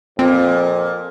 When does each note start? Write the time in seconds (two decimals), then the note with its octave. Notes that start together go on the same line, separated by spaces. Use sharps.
0.19 F2 A#2 C4